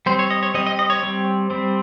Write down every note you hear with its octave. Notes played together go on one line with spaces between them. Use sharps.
G3 C4 C5
C#5
D#5
C#5
G3 C4 D#5
D#5
D#5
C#5
G3 C4
G3 C4